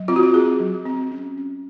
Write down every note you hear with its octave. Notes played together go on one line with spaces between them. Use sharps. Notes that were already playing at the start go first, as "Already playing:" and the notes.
Already playing: F#3
C4 F4
F#4
F4
C4 G#4
F#3
C4
C#4
C#4